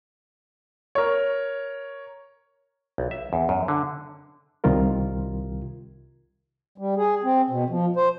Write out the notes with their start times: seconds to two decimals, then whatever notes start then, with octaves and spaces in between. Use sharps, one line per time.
0.95 A#4 C#5
2.98 B1
3.11 E5
3.33 E2
3.49 F#2
3.68 D3
4.64 C2 C3 D#3 G3 F4 A#4
6.78 G3
6.97 G#4
7.24 C4
7.50 B2
7.70 F3
7.96 C5